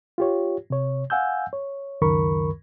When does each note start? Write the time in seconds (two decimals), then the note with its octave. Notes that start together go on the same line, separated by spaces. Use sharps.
0.18 F4 G4 C#5
0.70 C3 C#5
1.10 F5 F#5 G#5 E6 G6
1.53 C#5
2.01 C#2 F#2 D#3 A#4 B5 C#6